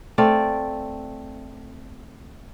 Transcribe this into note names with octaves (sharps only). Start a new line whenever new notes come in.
A3 C4 D5 F5